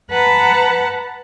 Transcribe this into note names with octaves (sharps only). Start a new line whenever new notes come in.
B4 F#5 A5 A#5